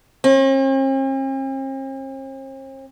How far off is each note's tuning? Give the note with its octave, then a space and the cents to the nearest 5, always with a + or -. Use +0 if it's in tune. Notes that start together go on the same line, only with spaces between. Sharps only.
C4 +45